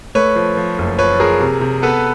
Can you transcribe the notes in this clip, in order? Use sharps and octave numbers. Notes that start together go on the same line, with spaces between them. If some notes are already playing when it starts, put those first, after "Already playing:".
A3 B4 C#5
F3
F3
F#1
F3 B4 C#5
F3 G#4 A#4
C3
C3
B3 A4 B4